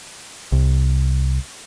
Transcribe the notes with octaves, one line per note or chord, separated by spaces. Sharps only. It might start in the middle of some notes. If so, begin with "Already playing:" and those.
C2